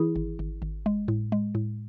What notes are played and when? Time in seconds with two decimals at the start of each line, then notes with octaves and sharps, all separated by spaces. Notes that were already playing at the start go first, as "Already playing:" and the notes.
Already playing: E3 E4 G#4
0.16 G#1
0.39 G#1
0.62 G#1
0.86 G#3
1.08 A2
1.32 G#3
1.55 A2